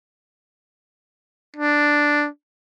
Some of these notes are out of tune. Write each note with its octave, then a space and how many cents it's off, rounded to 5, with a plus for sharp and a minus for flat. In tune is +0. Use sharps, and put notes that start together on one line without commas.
D4 +0